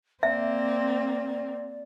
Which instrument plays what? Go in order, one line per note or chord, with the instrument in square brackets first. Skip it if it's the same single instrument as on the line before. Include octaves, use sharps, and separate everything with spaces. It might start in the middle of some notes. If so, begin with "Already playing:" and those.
[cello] A#3 C4 [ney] D5 [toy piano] E5